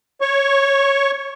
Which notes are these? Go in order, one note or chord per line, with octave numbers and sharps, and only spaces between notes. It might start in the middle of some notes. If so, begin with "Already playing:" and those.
C#5 C#6